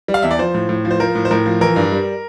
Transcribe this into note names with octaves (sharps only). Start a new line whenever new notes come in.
G3
F5
E2 E5
D5
F3 C5
A2
A2
F3
C5
F3 A#4
A2
C5
A2 A#4
F3
E3 A#4
G2
G3